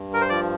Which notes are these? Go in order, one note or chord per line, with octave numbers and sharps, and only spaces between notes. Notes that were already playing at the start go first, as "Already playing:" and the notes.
Already playing: G2
A#4
C5
F3 D5